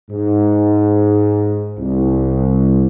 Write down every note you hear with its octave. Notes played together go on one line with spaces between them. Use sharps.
G#2
C2